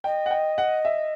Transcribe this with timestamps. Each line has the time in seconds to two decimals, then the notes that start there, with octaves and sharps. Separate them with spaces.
0.04 D#5 G5
0.26 F#5
0.31 G5
0.58 F#5
0.85 E5